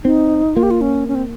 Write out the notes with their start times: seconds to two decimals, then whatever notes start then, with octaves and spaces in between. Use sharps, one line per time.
0.04 C4 D#4
0.55 A#3 F4
0.63 G4
0.71 F4
0.81 C#4
1.08 C#4
1.15 C4